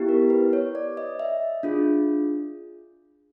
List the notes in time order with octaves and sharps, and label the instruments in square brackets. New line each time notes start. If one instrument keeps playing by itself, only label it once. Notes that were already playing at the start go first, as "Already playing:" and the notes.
Already playing: [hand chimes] B3 E4 G4
A#4
B4
C#5
D5
D#5
E5
D4 F4 G#4